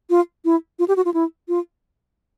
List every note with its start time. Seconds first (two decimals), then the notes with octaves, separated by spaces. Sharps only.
0.10 F4
0.45 E4
0.79 F4
0.88 G4
0.97 F#4
1.05 F4
1.14 E4
1.48 F4